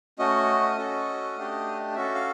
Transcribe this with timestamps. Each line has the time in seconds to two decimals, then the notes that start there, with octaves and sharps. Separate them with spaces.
0.19 A3 C#4 F#4 D#5
0.78 C#4 F#4 A4
1.37 A3 D4 G4
1.95 C#4 F#4 A4 E5
2.15 F5